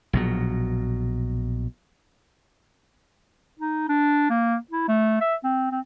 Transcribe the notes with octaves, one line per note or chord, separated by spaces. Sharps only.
A#1 B2 F#3
D#4
D4
A#3
E4
A3
E5
C4
C4